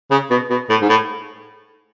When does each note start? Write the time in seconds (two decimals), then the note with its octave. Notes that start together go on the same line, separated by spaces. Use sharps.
0.11 C#3
0.30 B2
0.50 B2
0.70 A2
0.82 G#2
0.89 A2